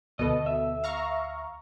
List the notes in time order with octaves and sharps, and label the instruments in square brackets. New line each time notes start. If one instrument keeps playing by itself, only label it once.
[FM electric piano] D2 [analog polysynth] B2 A4 [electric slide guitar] D#5
[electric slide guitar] E5
[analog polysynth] F5 A#5 C#6